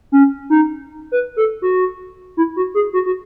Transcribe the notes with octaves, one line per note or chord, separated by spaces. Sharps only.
C#4
D#4
B4
A4
F#4
E4
F#4
G#4
F#4
F#4